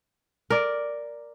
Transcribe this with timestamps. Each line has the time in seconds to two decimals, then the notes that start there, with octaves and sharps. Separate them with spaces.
0.50 A#4 D5